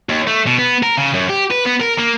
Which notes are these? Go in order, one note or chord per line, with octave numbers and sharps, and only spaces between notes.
D#2
A3
B2
B3
A#4
C#3
F#2
G4
B4
B3
A#4
A#3